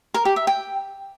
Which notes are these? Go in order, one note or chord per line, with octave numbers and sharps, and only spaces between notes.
A#4
G4
E5
G5